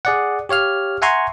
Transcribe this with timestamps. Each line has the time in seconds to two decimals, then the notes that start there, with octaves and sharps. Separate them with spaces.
0.05 G#4 D5 F#5
0.49 G4 C#5 F5 F6
1.02 E5 F#5 G#5 A#5 C6 C#6